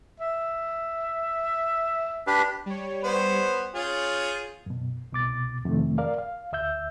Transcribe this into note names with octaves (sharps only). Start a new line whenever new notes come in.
E5
D4 G4 B4
G3 C#5
B3 B4 C5
C#4 F4 G#4 G6 A6
F#2 B2
C2 B2 D6 A6
F2 C3 D#3 A3
A#4 D5 F5
F5
D2 E5 E6 G6